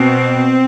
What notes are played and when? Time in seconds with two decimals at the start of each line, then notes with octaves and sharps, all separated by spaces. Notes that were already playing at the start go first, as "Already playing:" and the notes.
Already playing: B2 C4